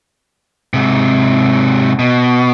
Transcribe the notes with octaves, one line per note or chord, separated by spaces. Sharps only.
G#2 C3
B2